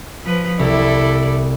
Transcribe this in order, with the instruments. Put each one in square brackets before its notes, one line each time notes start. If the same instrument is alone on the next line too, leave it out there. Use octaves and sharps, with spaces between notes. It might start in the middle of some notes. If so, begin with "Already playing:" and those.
[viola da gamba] F3 B4
[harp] C2 [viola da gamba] E4 A4 D5